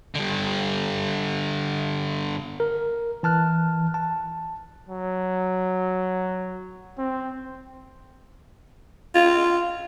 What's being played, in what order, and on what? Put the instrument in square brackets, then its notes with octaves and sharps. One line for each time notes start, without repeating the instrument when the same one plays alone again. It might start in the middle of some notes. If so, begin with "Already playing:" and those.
[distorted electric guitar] G2 D3
[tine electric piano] A#4
E3 A5 F6 F#6
A5
[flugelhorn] F#3
C4
[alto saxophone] F4